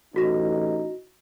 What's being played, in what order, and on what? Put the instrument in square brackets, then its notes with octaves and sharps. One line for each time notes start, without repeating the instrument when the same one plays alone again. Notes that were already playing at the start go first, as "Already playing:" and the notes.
[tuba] A1 [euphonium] D#4 [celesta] E4 F#4 A#6